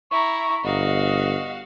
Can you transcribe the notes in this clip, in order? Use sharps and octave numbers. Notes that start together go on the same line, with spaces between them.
E4 A#5 C#6
G1 F#4 D#5 F5